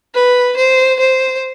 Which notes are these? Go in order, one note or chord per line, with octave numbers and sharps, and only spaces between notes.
B4
C5
C5